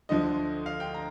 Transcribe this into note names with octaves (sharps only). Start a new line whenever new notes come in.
D2 D3 F3 D#5
F5
G5
A#5